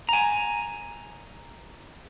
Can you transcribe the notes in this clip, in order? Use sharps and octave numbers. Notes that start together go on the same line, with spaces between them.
G#5 A#5